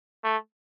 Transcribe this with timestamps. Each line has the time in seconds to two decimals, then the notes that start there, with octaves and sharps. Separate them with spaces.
0.24 A3